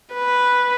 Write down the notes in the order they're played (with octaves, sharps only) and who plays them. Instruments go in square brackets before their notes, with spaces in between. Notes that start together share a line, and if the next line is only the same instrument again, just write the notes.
[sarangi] B4